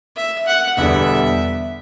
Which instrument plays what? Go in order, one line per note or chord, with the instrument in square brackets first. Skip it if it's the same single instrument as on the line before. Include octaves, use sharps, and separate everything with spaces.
[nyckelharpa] E5
F#5
[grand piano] E1 E2 D3 G3 B3 [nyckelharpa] E5